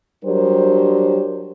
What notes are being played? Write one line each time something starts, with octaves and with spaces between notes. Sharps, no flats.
F#3 G3 D4 G4 A#4 C5